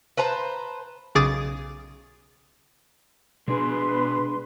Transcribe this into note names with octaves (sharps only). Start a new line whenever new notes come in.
B4 C5 A5 A#5
B1 C#3 G#4 D6 A6
B2 G#3 D4 G#4 B4 C6